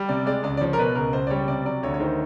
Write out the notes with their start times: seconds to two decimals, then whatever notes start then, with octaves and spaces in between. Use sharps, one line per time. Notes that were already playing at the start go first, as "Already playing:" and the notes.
Already playing: G3
0.09 C3 D5
0.26 G#3 D5
0.43 C#2 D5
0.57 D5
0.61 F3 C#5
0.73 A#4
0.78 B2 B4
0.95 C#2 A#4
1.13 C#2 C5
1.27 D5
1.30 G3 C#5
1.48 C3 D5
1.65 F#3 D5
1.83 D2 C#5
1.94 C#5
2.00 D#3 C5